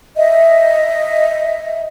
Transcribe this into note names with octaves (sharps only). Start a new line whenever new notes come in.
D#5 E5